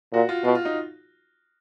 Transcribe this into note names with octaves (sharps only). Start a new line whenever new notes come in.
A#2 F#4
F4
B2 F4
F4
D#4